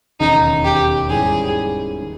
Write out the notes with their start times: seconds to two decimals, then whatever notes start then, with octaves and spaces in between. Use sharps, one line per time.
0.20 E1 D#2 C#3 D#4
0.65 G4
1.10 G#2 D#3 G3 C#4 E4 G#4
2.02 D#3